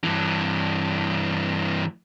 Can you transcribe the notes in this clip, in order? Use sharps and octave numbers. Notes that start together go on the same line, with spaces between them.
G2 E3